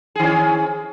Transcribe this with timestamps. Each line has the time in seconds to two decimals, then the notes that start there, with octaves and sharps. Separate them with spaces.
0.15 G#4
0.19 D#3
0.23 C#4